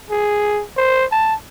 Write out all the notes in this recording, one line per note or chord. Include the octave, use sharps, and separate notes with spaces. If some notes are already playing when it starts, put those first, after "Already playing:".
G#4
C5
A5